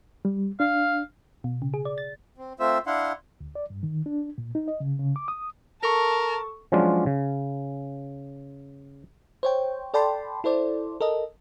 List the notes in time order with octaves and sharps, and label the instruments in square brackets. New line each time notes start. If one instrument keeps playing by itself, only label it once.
[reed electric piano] G3
[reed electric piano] D4 [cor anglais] F5
[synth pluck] B2
C#3
G#4
D5
A6
[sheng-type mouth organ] C4
A3 C4 F4 C5 E5 E6
D4 E4 F5 F#5 C6
[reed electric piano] D2
D5
G2
D#3
D4
A#2
D#4
D#5
C#3
C#3
D6
D#6
[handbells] A4 C#6 [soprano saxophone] A#4 [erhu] A5
[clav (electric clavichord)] F3 F#3 G#3 C#4 D4 F4
C#3
[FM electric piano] C5 C#5 G5
A4 D5 G5 A5 B5 C6
E4 A4 C5 D5
A4 A#4 D#5